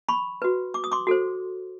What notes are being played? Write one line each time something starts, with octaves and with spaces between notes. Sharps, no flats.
B5 C#6
F#4 B4
D6
D#6
C6 D6
F#4 A4 C5